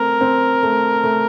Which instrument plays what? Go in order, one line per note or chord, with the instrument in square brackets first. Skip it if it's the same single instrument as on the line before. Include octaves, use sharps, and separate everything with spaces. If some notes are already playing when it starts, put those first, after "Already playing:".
Already playing: [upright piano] A3 C4 [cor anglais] A#4
[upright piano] C4
A3
A3